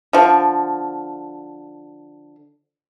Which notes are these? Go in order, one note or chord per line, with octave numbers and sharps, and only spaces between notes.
D3 F3